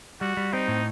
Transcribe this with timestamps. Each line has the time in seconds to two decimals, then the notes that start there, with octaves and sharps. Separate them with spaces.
0.21 G3 F#4
0.37 G3
0.53 C4 D#4
0.68 A2